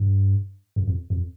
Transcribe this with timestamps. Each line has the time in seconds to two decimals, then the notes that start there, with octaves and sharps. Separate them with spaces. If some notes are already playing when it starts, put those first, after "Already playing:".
Already playing: G2
0.76 F#2
0.88 F2
1.10 F2